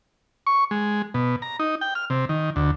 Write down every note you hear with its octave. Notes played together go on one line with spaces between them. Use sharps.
C#6
G#3
B2
A#5
D#4
G5
F6
C3
D#3
D2